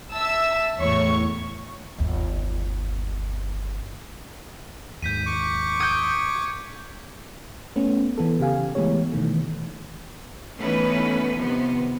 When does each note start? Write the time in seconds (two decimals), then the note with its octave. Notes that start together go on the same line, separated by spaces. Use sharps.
0.13 E5 A5 E6
0.78 E2 A2 C#5 C#6
1.98 G1 D#2
5.02 D#2 G#2 G6 B6 D#7
5.26 C#6 D6
5.80 D#6 G6 G#6 C#7
7.76 A3 B3 C#4
8.18 E3 B3 A4
8.40 C#3 G4 F5 G#5
8.75 E3 G#3 A3 B3 G4 C#5
9.12 B2 D#3 E3 A3
10.60 E3 A3 B3 C#4 D#4 B4
11.37 C3 D#3 F3 B3